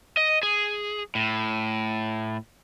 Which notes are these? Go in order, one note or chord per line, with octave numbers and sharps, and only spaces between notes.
D#5
G#4
A2